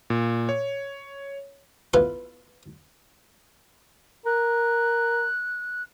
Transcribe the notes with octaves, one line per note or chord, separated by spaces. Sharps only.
A#2
C#5
B3 E4 F4 A4 B4
A#4 F#6